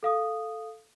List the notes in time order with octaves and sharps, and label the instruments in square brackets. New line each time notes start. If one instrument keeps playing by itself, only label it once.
[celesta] A4 F5 D#6